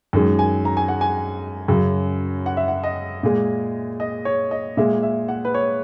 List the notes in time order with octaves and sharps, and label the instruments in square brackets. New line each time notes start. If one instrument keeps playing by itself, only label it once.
[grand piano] F#2 D#3 G#3
G#5
A#5
G#5
F#5
G#5
F#2 C#3 F#3
F#5
E5
F#5
D#5
A#2 G#3
D#5
C#5
D#5
A#2 G#3 E5
E5
F#5
B4
C#5